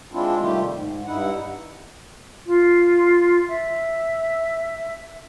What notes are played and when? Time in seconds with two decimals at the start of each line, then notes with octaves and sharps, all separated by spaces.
0.13 G#3 C4 D4 E4 F4
0.40 C3 D#3 G3 A3 F4 G4
0.71 G#2
1.06 G2 D#4 E4 F#5
2.45 F4
3.48 E5